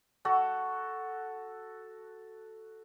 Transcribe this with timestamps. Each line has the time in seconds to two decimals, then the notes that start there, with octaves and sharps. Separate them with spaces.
0.25 F#4 A4